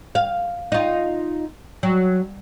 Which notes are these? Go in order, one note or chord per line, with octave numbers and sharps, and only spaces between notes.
F5
D#4 F4
F#3